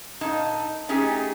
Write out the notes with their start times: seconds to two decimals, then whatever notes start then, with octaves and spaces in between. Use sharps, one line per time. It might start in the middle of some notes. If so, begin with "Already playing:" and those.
0.21 A#2 D#4 A5
0.89 A3 C#4 D#4 G4 G#4 G#5